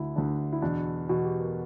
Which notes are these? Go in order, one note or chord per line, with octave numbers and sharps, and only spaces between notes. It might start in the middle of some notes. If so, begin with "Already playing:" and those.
Already playing: D2 D3 E4
D2 D3 D4
E4
E2 B2 D4
E2 B2 F#4
G4
A#4